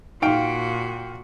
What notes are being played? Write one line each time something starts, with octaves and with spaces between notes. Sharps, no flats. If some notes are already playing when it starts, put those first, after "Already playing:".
A#2 D#4 F#4 F5 G5 D7